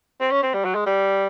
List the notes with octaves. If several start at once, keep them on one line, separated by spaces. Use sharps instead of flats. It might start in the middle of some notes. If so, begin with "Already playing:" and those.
C4
C#4
C4
G3
F#3
G#3
G3